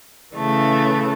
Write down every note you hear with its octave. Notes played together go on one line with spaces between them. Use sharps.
C#3 E3 A3